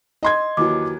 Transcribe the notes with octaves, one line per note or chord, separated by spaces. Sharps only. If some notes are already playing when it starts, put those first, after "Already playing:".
D#5 C6 G#6
D#2 E3 F#3 D6